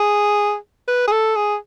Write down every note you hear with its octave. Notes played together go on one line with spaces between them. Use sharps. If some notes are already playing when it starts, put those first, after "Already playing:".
Already playing: G#4
B4
G#4
A4
G#4